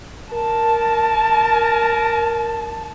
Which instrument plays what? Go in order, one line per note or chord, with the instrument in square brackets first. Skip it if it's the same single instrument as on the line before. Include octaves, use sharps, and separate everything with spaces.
[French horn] A#4 [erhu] A5